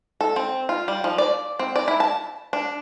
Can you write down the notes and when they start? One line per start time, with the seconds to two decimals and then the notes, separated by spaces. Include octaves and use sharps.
0.21 A4
0.36 C4
0.69 F4
0.88 G3
1.04 F3
1.18 D5
1.59 C4
1.76 D5
1.88 E4
2.00 A5
2.53 D4